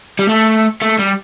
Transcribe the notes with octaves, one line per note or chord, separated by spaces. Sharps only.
G3
A3
A3
G3